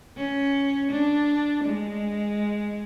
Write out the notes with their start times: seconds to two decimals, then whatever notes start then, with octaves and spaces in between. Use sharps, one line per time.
0.17 C#4
0.91 D4
1.64 G#3